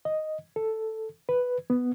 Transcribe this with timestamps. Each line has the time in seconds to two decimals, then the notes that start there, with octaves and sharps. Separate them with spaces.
0.05 D#5
0.56 A4
1.29 B4
1.70 B3